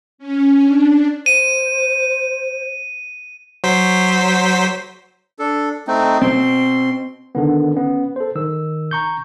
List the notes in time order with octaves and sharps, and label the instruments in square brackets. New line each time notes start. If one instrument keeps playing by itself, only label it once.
[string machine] C#4
D4
[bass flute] C5 [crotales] D#7
[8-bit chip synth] F#3 C5 B6
[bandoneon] D4 A4
A3 C4 D#4
[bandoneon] B2 C6 [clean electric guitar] C4
[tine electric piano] D3 D#3 B3
B3 C#4
A4 C5
D#3 E6
A#5 C#6 G6